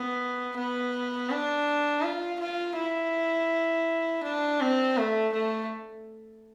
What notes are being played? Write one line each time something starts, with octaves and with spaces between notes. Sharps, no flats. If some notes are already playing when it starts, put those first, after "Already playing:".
Already playing: B3
B3
D4
F4
F4
E4
D4
C4
A3
A3